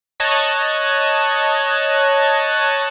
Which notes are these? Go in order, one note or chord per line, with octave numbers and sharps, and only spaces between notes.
C#5 D#5 A5 F#6 G#6